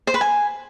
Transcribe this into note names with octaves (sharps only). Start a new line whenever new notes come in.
C5
B4
G#5